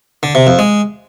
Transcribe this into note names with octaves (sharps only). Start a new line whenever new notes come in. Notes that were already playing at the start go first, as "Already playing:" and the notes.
D3
C3
F2
G#3